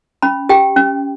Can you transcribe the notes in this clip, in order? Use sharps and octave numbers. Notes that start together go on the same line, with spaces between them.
C#4 B5
G4 G5
C#4